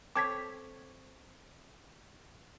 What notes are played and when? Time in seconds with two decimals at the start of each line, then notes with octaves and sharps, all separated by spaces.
0.15 C4 A4 C#5 D6 G#6 B6